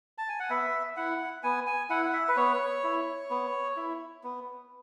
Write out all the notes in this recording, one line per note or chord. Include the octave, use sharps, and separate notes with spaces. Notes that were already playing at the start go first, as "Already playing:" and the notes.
A5
G#5
F#5
B3 E5
E4 F#5
B3 G#5
G#5
E4 F#5
F#5
E5
B4
B3 C#5
E4
B3
E4
B3